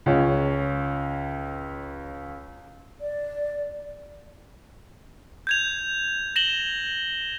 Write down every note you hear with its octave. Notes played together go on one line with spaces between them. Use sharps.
C#2 C#4
D5
G6 G#6 F7
A#6 E7 F#7 G7